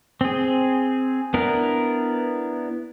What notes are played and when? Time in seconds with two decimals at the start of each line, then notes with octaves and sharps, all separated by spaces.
0.21 C4 G#4
1.34 B3 D4 E4 A#4